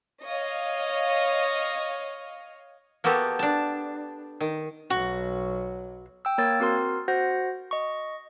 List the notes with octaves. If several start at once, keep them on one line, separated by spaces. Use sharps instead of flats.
C#5 D#5 F5
A#3 B3 F#4 G4 A4
D4 A5
D#3
B1 F#3 F#4
G5 E6
A#3 A#4 C#5 E6 A6
C4 F#4 A#4 C6
F#4 C5 F#5 A#6
D#5 C#6